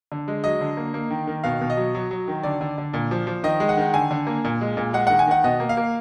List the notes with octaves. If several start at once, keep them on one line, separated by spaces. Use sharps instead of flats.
D3
G#3
F#3 D#5
D3
A#3
A#3
D#3
D#3
B2 F5
B2
D#5
F#3
F#3
F#3
D#3
D3 D5
D3
D3
A#2
F3
F3
D#3 D#5
G#3
F#5
D#3
D3 G#5
D3
A#3
A#2
G#3
A#2
G#3 F#5
D#3 F#5
G#5
D#3 F#5
B2 D#5
A#3
F5
A#3